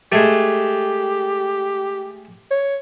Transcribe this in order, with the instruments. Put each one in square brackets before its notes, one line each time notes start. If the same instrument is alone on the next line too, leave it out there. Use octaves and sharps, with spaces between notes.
[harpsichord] G#3 A3 [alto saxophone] G4
[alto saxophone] C#5